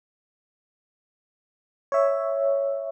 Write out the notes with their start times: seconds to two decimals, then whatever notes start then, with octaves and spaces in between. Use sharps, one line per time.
1.92 C#5 E5